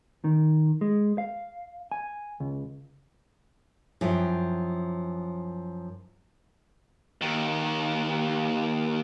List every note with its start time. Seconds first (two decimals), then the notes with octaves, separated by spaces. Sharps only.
0.24 D#3
0.81 G#3
1.18 F5
1.92 G#5
2.40 C#2
4.01 F#2 F3 E4 G5
7.21 D#2 D#3